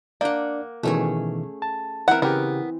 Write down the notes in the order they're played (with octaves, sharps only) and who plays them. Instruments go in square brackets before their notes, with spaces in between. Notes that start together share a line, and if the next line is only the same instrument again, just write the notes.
[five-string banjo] A#3 [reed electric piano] D4 D5 [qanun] F#5 G5
[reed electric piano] B2 D#3 E3 [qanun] A3 C#4 G#4
[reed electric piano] A5
[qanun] E3 C4 [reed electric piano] E4 [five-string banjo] A#4 F#5
[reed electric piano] C#3 G4 [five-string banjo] B3 A#4